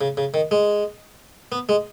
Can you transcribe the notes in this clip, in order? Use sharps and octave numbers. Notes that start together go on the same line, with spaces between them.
C#3
C#3
D#3
G#3
B3
G#3